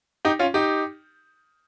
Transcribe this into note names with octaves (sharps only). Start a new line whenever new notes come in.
D#4 G4
C#4 F4
D#4 G4